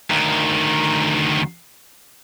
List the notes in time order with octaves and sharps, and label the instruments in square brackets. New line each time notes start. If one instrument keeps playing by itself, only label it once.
[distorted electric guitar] D2 D#3